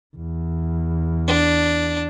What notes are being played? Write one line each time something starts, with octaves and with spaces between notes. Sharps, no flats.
E2
D4